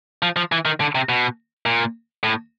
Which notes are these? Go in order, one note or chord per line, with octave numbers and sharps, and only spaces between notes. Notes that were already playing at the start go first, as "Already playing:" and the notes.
F3
F3
E3
D#3
D3
C3
B2
A#2
A2